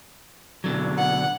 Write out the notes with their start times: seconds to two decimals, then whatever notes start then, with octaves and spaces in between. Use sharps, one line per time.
0.64 B2 D3 F#3
0.97 F#5